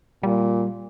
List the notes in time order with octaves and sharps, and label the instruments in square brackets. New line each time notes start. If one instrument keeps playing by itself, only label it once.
[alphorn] A#2 [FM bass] G3